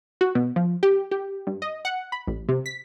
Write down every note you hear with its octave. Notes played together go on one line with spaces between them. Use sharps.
F#4
B2
F3
G4
G4
G2
D#5
F#5
B5
A1
C3
B6